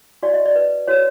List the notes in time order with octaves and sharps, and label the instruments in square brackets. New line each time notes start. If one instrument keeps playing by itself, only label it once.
[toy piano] F#4 D5
D#5
D5
B4
F#4 C#5